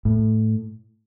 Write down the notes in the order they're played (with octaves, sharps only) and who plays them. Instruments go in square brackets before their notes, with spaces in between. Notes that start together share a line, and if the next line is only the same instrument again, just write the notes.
[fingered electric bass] A2